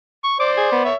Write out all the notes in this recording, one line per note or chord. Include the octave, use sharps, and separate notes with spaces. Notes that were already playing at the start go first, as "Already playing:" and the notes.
C#6
C5 D5 D6
G#4
B3
C#5 E5